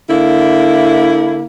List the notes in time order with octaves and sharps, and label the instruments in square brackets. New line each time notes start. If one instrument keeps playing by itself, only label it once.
[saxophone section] D3 A#3 E4